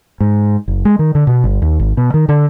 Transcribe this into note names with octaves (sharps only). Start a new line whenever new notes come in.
G#2
F#1
G#3
D#3
D3
B2
G1
D#2
G#1
B2
D#3
D3